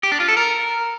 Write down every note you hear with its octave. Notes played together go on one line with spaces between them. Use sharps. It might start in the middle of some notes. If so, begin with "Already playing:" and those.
G4
D4
F4
A4
A#4